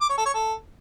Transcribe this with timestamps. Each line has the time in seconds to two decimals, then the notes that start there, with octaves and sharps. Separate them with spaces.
0.01 D6
0.09 C#5
0.18 A4
0.26 C#5
0.34 A4